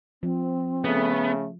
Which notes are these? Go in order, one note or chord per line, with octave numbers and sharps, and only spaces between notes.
F3 C4
C#3 A3 B3